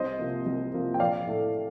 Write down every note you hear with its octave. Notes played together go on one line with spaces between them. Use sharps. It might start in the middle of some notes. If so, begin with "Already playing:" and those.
Already playing: C2 C5 D#5
C3 F3 A#3
C2
C3 F3 A#3
G5
A#1 D5 F5
A2 A3